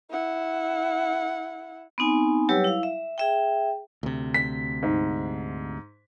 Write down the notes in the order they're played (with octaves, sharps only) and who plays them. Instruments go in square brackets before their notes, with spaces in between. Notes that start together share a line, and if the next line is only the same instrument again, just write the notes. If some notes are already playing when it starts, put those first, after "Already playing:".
[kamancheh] E4 F#5
[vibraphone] B3 C4 D#4 G#5
F#3 G3 G4 B4 C#5 E6
E4 F5
E5
G#4 E5 G5
[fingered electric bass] D2 C3
[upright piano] B6
G#2